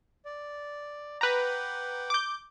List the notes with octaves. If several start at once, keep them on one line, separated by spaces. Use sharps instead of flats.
D5
B4 F#5 G5 A#5 D6
D6 G6